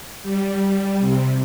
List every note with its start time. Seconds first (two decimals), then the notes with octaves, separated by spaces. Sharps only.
0.23 G3
1.00 C3